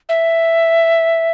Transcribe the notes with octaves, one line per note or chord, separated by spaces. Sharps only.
E5